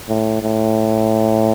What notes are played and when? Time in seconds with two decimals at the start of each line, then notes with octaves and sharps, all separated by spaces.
0.09 A2
0.42 A2